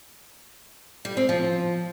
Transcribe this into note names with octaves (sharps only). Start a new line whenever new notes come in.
G3
C4
F3